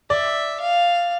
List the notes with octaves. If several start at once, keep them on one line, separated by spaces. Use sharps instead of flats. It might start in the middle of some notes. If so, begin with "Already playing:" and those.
D5 E5
F5